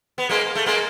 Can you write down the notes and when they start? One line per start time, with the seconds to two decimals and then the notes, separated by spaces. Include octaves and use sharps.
0.18 B3
0.30 G#3 A#3
0.55 A3
0.66 G#3 A#3